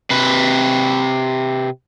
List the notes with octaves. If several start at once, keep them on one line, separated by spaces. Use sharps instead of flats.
C3 B4